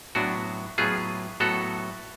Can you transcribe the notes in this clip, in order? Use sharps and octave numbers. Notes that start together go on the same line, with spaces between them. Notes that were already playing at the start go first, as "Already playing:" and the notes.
A2 F#3 B3 D4 F#4
A2 F#3 B3 F4 G#4
A2 F#3 B3 F#4 A4